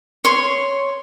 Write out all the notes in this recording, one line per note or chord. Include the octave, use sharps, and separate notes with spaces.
C#5 C6